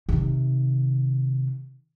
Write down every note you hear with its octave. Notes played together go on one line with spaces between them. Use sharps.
C3 D#3